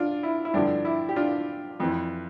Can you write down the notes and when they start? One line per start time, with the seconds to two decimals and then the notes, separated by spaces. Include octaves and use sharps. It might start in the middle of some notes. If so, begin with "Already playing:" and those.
Already playing: D4 F4
0.23 E4
0.45 E4
0.54 G2 D3 F3 D4
0.85 E4
1.09 G4
1.16 D4 F4
1.80 F2 E3